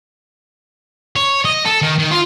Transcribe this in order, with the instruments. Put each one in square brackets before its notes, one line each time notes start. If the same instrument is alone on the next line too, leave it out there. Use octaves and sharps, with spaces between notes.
[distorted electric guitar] C#5
D#5
A4
D#3
D#3
F4